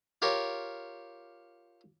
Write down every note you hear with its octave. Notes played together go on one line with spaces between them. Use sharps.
F4 G4 A#4 C#5